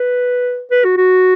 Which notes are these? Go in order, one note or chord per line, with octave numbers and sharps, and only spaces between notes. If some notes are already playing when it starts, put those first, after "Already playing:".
Already playing: B4
B4
F#4
F#4